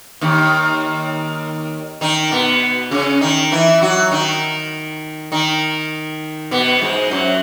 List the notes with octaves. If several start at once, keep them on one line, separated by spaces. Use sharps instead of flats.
D#2 D#3
D#3 D#4
B2 B3
C#3 C#4
D#3 D#4
E3 E4
F#3 F#4
D#3 D#4
D#3 D#4
B2 B3
G#2 G#3
F#2 F#3